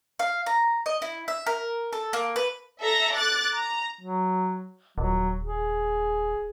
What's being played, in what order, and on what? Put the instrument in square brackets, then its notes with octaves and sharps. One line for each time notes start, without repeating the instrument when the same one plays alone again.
[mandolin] F5
A#5
D#5
E4
E5
A#4
A4
A#3
B4
[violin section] A4 E5 A#5 A#6
D6 F#6 A6
A#5
[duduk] F#3
[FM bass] D#1 [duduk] F#3
[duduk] G#4